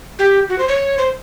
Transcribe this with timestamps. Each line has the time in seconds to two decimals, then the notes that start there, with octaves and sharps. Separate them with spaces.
0.19 G4
0.49 F#4
0.59 C5
0.68 C#5
0.98 C5